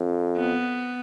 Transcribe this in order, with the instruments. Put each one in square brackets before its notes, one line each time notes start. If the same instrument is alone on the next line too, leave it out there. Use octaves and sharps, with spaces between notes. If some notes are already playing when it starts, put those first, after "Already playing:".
Already playing: [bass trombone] F2
[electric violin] B3